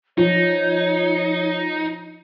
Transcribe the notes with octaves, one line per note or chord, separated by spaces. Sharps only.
F3 D#4 C#5